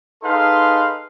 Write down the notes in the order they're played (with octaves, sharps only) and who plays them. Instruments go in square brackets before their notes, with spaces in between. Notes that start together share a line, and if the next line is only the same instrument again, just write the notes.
[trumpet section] D#4 G#4 A4 B4 F5 C6